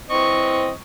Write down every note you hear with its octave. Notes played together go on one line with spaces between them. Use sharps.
E3 C4 D#5 C#6